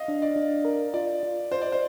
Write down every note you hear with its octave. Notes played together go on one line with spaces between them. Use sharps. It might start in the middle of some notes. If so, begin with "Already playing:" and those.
Already playing: D#5 F5
D4
D5
D4
A#4
F4 D5
F4
F4 C5
D5
C5